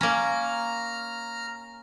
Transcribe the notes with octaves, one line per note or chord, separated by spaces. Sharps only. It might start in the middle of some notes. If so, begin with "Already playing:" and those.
A#3 C#4 A#5 F6